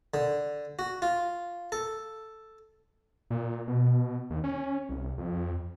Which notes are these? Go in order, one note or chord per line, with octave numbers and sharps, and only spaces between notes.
D3
F#4
F4
A4
A#2
B2
D#2
C#4
C2
F2